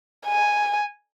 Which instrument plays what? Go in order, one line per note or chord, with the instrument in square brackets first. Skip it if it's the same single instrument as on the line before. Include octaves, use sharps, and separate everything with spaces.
[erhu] G#5